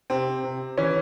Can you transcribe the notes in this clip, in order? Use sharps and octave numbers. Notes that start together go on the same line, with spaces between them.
C3 C4
C3
E3 C#4